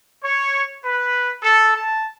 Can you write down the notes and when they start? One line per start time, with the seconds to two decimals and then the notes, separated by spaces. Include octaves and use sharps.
0.23 C#5
0.83 B4
1.40 A4
1.74 A5